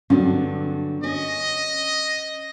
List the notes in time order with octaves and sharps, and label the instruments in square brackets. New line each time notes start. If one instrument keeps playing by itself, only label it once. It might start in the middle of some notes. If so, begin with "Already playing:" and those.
[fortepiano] G2 [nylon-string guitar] D3 F#3 B3
[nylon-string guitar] C#4 [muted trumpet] D#5